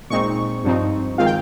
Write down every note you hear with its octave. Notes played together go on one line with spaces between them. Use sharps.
A#2 G#3 C4 D#4 C#6
G2 F3 C4 D#4
D#3 G#3 C4 F4 F5
G5